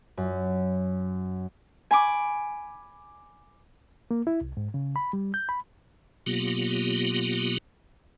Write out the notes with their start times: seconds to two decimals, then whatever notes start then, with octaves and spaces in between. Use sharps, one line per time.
0.17 F#2
1.91 G#5 B5 D6
4.11 A#3
4.27 E4
4.41 C2
4.57 G#2
4.74 C#3
4.96 B5
5.13 G3
5.34 G6
5.49 B5
6.26 B2 F#3 A#3 B3 F4 G4